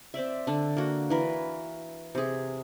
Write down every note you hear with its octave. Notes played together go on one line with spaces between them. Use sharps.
C4 C5 D5 E5
D3 D4
A#3 F#4
E3 A#4 B4
C3 G#4